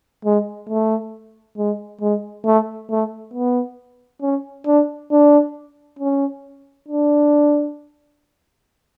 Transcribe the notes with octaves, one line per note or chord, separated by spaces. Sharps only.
G#3
A3
G#3
G#3
A3
A3
B3
C#4
D4
D4
C#4
D4